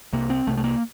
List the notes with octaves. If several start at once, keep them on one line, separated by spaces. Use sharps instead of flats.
C2 C3 A#3
C4
C2 C3 A3
A3
A#3